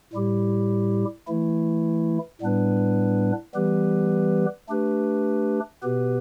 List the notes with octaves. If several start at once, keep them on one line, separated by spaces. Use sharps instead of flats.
A2 G3 E4 G4
E3 A3 E4
A2 G3 B3 D4 B4
E3 G3 B3 G4 B4
A3 D4 G4 B4
B2 B3 G4 B4